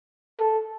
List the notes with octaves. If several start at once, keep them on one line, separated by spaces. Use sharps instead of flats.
A4